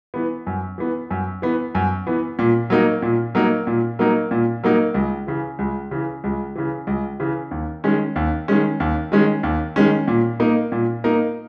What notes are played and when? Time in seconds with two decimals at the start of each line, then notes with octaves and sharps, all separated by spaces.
0.14 E3 B3
0.47 F#2
0.78 E3 B3
1.11 F#2
1.42 E3 B3
1.75 F#2
2.07 E3 B3
2.39 A#2
2.70 F#3 A#3 D#4 A#4
3.02 A#2
3.35 F#3 A#3 D#4 A#4
3.67 A#2
3.99 F#3 A#3 D#4 A#4
4.31 A#2
4.64 F#3 A#3 D#4 A#4
4.94 C#2
5.27 C#3 E3
5.59 C#2
5.91 C#3 E3
6.24 C#2
6.56 C#3 E3
6.87 C#2
7.20 C#3 E3
7.51 D#2
7.84 D#3 G#3 C#4
8.16 D#2
8.48 D#3 G#3 C#4
8.80 D#2
9.12 D#3 G#3 C#4
9.43 D#2
9.76 D#3 G#3 C#4
10.08 A#2
10.40 A#3 D#4 A#4
10.72 A#2
11.04 A#3 D#4 A#4